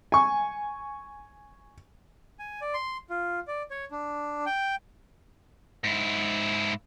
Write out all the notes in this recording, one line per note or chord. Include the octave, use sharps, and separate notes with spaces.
G#5 C#6
G#5
D5
C6
F4
D5
C#5
D4
G5
G#2 E4